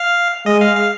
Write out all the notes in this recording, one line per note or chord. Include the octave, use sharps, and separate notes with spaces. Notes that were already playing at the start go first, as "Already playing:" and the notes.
Already playing: F5
G#3 D#5
F5
F5